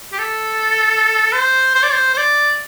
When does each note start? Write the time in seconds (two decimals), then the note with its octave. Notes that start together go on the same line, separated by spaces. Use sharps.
0.13 G4
0.19 A4
1.32 C5
1.75 C5
1.83 D5
1.92 C5
2.14 C5
2.18 D5